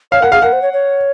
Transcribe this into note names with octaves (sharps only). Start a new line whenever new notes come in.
C#5 F5
A#4 F#5
G#4 F5
A#4 F#5
C5
C#5
C#5